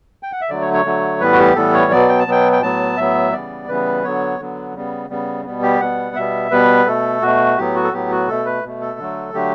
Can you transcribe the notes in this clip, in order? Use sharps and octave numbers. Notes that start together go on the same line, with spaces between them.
G5
F#5
E5
D3 F#3 A3 D5
C#5
C#5
D3 F#3 A3
A2 E3 G3 B3 B4
F#4
G4
A2 E3 G3 B3 A4
C#5
B2 F#3 B3 D5
G5
A5
B2 F#3 B3 G5
G5
A2 F#3 B3 A5
A2 F#3 B3 E5
C#3 E3 G3 B3 D5
C#3 E3 G3 B3 B4
D3 F#3 B3 C#5
D3 F#3 B3
C#3 G3 B3
C#3 G3 B3
B2 G3 B3
G4
B2 G3 B3 F#5
B2 G3 B3 E5
B2 G3 B3 B4
B2 A3 A4
B2 A3 F#4
A2 F#3 B3 G4
F#4
A4
A2 F#3 B3 G4
F#4
B2 A3 A4
B4
B2 A3
A4
D3 F#3 A3
D3 F#3 A3 G4